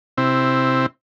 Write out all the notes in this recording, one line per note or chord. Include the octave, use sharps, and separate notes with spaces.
C3 C4 E4